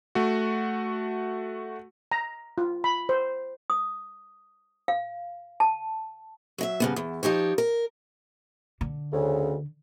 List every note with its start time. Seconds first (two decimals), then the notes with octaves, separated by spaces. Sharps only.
0.15 A3 F#4
2.12 A#5
2.58 F4
2.84 B5
3.09 C5
3.70 D#6
4.88 F5
5.60 A5
6.58 F#3 D#5 E5
6.80 G2 C#3 B3
6.96 E2
7.23 F3 D#4 G4 C#5
7.58 A#4
8.81 D3
9.13 D2 C#3